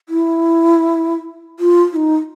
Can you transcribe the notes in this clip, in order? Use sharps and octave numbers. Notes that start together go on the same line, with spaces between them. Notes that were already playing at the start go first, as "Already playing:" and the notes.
E4
F4
E4
D#4